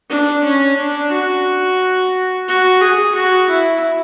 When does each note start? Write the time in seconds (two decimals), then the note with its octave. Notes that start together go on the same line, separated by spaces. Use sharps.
0.10 D4
0.44 C#4
0.77 D4
1.11 F#4
2.48 F#4
2.81 G#4
3.15 F#4
3.49 E4